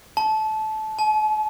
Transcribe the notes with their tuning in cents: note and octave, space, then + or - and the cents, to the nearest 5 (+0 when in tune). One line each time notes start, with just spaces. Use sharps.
A5 -20
A5 -45